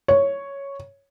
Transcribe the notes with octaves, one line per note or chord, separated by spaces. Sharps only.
C#5